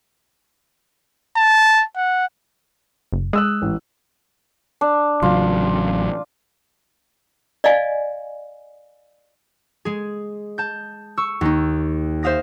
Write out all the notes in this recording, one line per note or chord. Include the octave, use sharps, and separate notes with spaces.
A5
F#5
F#1
G#3 D#6 E6 F#6
A1
D4
A1 C#3 F#3 F4
D5 D#5 F5 G#5
G#3 G#4
A5 G6
C#6 E6
D#2 D#4
C5 E5 F5 D#6 A#6